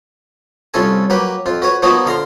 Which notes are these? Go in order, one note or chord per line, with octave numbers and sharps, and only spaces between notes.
C2 C#4 F4 A4 G#5
F#3 A#3 G4 B4
F2 F4
F#4 B4 C#5
F3 A#3 B3 D#4 F#4 C#5
D3 F5 A#5 C6